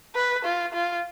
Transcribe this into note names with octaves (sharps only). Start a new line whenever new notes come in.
B4
F4
F4